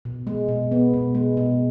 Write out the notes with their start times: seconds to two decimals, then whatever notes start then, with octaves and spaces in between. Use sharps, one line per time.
0.05 B2
0.27 G#3
0.49 B2
0.72 B3
0.94 B2
1.15 G#3
1.37 B2